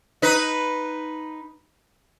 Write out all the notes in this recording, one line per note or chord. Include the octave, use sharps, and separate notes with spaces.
D#4 B4